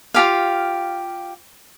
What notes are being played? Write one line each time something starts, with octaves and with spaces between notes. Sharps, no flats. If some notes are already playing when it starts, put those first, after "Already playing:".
F4 G4 F5